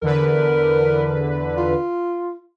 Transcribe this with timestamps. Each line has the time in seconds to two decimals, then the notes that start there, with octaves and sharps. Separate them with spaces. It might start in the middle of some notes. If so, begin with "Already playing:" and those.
0.02 E2 D3 A#4 B4
1.58 F4